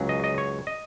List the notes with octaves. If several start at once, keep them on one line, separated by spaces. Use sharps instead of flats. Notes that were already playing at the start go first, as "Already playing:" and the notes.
Already playing: C#2 C#3 F#3
D#5
D#5
C#5
D#5